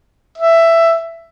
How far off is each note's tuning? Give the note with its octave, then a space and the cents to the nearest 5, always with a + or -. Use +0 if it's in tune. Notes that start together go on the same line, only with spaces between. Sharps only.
E5 +10